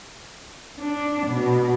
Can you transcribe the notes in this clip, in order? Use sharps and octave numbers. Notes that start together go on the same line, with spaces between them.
D4
B2